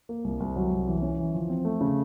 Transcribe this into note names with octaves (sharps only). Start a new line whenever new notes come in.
A#3
C2
C2
F#3
C2
E3
C#4
E3
F3
C4
A3
C#3